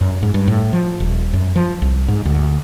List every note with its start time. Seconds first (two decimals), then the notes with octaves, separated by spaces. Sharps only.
0.01 F#2
0.23 G#2
0.34 G2
0.48 A2
0.73 F3
1.00 D#1
1.33 F#2
1.56 F3
1.82 C2
2.08 G#2
2.25 D2